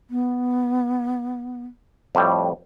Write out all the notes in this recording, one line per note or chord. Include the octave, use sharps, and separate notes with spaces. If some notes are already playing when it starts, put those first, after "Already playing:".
B3
F2 A2 G3